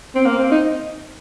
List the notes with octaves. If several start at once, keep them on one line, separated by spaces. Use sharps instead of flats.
C4
A#3
C4
D#4